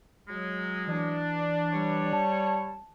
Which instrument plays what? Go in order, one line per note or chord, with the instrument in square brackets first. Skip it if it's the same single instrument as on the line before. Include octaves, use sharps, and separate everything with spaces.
[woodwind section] F#3 G#3
[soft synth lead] E3 [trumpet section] D4
[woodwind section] G3 C#5
[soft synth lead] A5